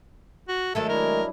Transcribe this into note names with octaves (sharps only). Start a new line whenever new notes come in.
F#4
D#3 F#3 G#3 A3 A4 E5
F#3 D4 E4 A#4